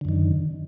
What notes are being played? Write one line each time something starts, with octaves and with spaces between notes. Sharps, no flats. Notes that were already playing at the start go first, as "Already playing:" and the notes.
F#2 D3 D#3